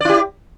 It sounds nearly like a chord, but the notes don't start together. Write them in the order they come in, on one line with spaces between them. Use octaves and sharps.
D5 E4 G4